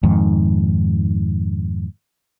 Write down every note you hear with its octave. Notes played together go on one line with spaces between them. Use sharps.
F2 G#2 D#3